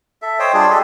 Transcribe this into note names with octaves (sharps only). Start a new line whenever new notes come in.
A4 E5
C5 C#5 D#5 G5
G3 D4 F4 G#4
G4 A4 D#5